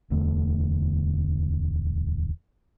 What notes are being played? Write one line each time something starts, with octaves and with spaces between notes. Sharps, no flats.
D1 E2 D3 A3